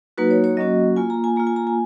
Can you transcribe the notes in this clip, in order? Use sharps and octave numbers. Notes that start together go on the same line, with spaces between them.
F#3 A#3 D#4 F#4 B4
C#5
C#5
F#3 A#3 C#4 F#4 D#5
A#3 F4 G#5
A#5
G#5
A#3 F4 A#5
G#5
A#5
G#5